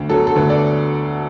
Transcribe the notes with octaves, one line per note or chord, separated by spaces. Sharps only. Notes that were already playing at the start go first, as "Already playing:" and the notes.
Already playing: D2
D3 F#3 B3 A4
A4
D2 B4
A4 D5